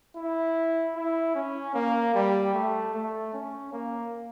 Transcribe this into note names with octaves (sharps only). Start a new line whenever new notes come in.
E4
E4
C#4
A#3
G3
A3
A3
C#4
A#3